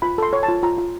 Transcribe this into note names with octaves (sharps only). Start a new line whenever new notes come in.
F4 B5
A4 C6
C#5
A5
F4
F4 A#5
F4